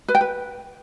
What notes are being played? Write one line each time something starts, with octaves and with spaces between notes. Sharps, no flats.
B4
G5
B4